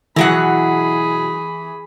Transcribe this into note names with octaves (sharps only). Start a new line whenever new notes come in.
B2 E3 F#3 E4 G#4 F#5 B5